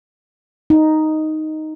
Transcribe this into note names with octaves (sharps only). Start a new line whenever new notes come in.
D#4